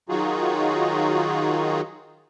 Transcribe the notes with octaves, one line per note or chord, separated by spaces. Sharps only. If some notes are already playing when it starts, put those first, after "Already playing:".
D#3 F#3 D#4 F4 F#4 G#4